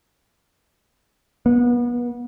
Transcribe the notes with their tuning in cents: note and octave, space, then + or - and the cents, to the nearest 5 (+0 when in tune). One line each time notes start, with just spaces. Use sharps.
B3 -30